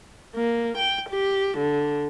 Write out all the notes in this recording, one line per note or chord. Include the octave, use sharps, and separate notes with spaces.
A#3
G5
G4
D3